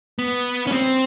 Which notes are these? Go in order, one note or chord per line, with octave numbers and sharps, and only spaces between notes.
B3
C#4
C4